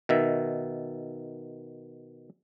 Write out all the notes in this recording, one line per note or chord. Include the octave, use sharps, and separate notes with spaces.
B2 D#3 E5